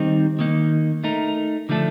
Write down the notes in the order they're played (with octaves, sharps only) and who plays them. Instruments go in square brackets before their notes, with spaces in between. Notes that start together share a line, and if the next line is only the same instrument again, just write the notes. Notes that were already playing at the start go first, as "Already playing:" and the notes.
Already playing: [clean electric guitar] D#3 G3 C4 D#4
D#3 A#3 D#4
A3 D#4 A#4
D3 F3 A3 D4 A4